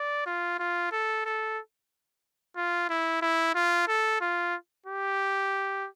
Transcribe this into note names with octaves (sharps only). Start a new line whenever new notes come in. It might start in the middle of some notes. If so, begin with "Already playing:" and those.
Already playing: D5
F4
F4
A4
A4
F4
E4
E4
F4
A4
F4
G4